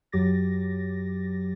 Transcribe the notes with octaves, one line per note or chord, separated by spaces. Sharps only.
F#2 F#3 G4 D6 A6 A#6